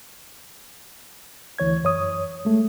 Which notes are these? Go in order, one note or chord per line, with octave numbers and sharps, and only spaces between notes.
D2 E3 C#5 G#6
F#2 C#5 D#6
G#3 A3